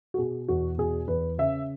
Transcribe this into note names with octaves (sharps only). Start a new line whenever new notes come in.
F#4
B2 G#4
E2 F#4
B2 G#4
E2 B4
C#3 E5